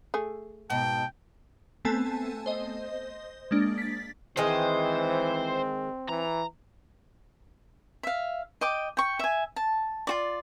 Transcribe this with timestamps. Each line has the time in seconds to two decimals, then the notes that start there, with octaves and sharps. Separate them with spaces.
0.14 A3 G#4
0.70 G#2 B2 G5 A5
1.85 A3 B3 C4 A4 G#5 A5
2.46 C5 D#5
3.51 G#3 A#3 D4
3.78 A6 B6
4.37 D#3 E3 G#3 C4 C5 D#5
6.09 E3 A#5
8.03 E5 F5
8.61 D#5 G5 D6
8.97 G5 C#6
9.19 E5 G#5
9.56 A5
10.07 F4 F#4 D5